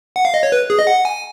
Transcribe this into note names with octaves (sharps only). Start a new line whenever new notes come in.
F#5
F5
D#5
C#5
B4
G#4
D#5
F#5
G#5